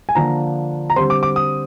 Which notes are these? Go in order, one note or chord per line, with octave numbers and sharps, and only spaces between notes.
G#5
D3 F3 A#3 D4 A#5
A#5
D3 G3 C4 C6
D6
D6
D#6